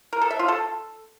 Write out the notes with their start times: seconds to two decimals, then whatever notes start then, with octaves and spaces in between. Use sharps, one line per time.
0.13 A#4
0.21 A4
0.30 E5
0.39 F4
0.48 A4